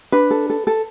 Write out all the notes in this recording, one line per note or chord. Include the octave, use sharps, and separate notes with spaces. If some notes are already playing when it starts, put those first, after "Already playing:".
D4 B4
A4
A4
A4